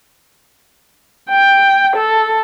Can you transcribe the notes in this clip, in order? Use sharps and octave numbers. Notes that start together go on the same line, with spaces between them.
G5
A4